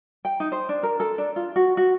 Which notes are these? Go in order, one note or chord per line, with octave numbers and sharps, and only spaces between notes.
G5
D#4
C5
D4
A#4
A4
D4
F4
F#4
F#4